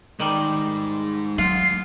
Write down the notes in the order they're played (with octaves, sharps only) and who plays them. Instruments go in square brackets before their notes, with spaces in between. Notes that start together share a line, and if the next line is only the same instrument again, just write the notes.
[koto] D#3 G3 [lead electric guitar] G#3 D#4
[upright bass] F#3 [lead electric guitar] A3 F#5 [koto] F4 [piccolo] C7